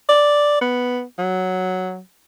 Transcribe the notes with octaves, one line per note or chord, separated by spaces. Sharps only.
D5
B3
F#3